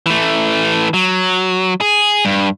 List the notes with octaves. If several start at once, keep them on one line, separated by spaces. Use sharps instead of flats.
E3 A3
F#3
G#4
G2